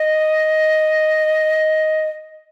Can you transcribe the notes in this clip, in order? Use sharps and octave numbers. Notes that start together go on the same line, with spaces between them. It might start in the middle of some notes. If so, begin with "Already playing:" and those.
Already playing: D#5